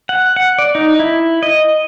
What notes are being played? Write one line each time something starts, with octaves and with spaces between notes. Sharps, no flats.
F#5
F#5
D5
D#4
E4
D#5